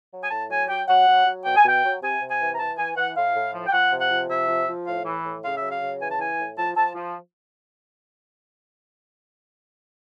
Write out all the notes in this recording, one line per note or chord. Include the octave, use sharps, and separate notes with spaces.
F#3
G#5
A2 A5
F#3 G#5
F#3 G5
F#3 F#5
F#3
F#3
B2 G5
G#5
B2 G5
F#3
C3 G#5
C3
G#5
E3
A#5
E3 A5
E3 G#5
E3 F#5
A2 F5
A2
F3
G5
F3 F#5
C3
F#5
F3
C3 E5
F3
F3
A2 F5
E3
A2
C#3 F5
E5
F#3
F5
C#3
E3 G#5
A5
E3 G#5
A2
F3 A5
F3 A5
F3